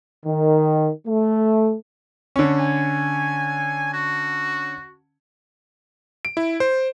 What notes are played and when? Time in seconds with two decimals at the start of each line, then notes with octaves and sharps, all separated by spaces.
0.26 D#3
1.07 A3
2.36 D3 C#4
2.59 G#5
3.93 F#4
6.25 D7
6.37 E4
6.60 C5